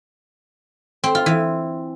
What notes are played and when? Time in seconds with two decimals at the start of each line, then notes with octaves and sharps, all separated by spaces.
1.04 C4
1.15 F4
1.26 E3